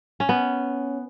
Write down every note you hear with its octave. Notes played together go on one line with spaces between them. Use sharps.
C#4
B3